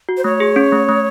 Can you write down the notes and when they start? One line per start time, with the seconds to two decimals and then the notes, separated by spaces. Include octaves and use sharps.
0.09 F#4
0.17 C5
0.24 A3 C#5
0.40 G#4
0.56 C#4
0.72 A3
0.89 A3